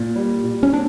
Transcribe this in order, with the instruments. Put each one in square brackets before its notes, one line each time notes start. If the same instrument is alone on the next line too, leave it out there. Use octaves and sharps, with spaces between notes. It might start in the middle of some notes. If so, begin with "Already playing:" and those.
Already playing: [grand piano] A#2
G3
A#2
[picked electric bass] C#4
[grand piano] C4 [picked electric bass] D4